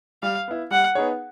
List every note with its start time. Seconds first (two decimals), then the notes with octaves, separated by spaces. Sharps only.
0.23 G3 F5
0.48 B3 E4
0.71 G3 F#5
0.95 B3 D#4 G#4 C#5